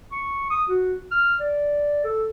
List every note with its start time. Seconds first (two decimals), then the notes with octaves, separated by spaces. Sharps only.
0.12 C#6
0.50 D#6
0.68 F#4
1.11 F6
1.40 D5
2.04 A4